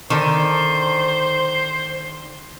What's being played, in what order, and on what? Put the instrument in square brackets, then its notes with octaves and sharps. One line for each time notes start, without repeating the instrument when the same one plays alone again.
[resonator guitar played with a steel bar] D3 D#3 [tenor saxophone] C5